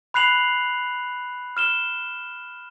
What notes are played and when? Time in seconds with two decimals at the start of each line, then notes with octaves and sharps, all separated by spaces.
0.14 B5 F#6 C7 F7 F#7
1.57 F6 E7 G7